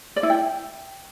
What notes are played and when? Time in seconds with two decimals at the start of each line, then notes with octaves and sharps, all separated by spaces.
0.16 D5
0.23 E4
0.30 G5